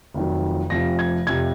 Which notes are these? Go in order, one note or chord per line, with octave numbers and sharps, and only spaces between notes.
F1 F2 D#3 F#3
F1 F2 C3 F3 A#6
G#6
F1 F2 C3 F3 G#6